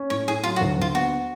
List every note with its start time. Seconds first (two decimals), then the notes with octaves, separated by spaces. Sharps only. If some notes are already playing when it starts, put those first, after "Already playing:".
Already playing: C#4
0.10 A2 C#5
0.27 A2 G#4
0.43 F#3 F4
0.56 F#4
0.61 D2
0.78 D2 F4
0.94 B3 F#4